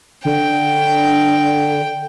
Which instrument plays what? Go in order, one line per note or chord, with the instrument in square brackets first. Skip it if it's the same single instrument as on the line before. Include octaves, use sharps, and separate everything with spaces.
[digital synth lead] D3 [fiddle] G5